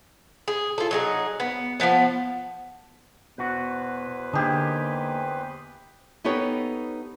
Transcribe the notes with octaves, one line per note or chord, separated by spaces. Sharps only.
G#4
F4 A4
F#3 D#4 G#4
B3
F3 F#3 B3 A5
E2 B2 F#4 B4 C5
D3 A#3 D#4 G4 G#4 D#5
B3 D#4 G4 A4 B4 C#5